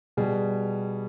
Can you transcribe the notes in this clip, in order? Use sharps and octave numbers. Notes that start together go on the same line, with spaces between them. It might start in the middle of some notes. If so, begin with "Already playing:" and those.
B2 G3 G#4